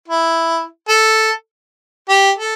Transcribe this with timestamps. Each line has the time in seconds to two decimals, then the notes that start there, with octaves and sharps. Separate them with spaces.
0.08 E4
0.89 A4
2.09 G4
2.38 A4